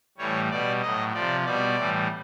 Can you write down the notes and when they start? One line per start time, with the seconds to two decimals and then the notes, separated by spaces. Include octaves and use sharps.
0.18 A2 E3 G3 C#5
0.50 B2 G3 D5
0.82 A2 F#3 D#5
1.13 C3 F3 D5
1.45 B2 G3 D5
1.76 A2 E3 G3